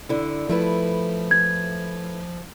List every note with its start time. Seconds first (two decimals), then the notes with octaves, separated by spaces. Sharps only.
0.09 D3 E4
0.49 F3 A3 E4 B4
1.31 G#6